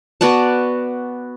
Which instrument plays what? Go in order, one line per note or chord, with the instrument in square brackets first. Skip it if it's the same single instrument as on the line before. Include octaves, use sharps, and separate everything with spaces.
[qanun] B3 F#4 D5 A5